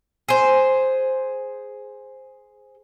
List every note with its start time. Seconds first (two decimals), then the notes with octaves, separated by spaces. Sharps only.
0.29 G#4 C5